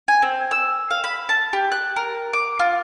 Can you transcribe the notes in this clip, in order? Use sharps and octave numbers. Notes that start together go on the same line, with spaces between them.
G#5
C4
E6
F5
B5
A5
G4
F#6
A#4
D6
F4